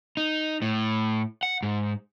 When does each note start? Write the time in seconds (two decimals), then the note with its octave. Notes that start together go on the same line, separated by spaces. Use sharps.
0.17 D#4
0.62 A2
1.43 F#5
1.63 G#2